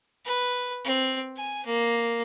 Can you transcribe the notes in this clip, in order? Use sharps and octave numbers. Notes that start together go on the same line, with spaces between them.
B4
C4
G#5
A#3